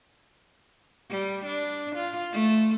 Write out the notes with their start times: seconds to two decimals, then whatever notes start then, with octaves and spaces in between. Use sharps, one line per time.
1.10 G3
1.46 D4
1.96 F4
2.33 A3